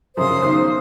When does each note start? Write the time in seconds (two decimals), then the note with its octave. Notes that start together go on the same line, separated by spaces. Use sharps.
0.17 F#2 C#3 C5 D#6
0.42 B1 D#3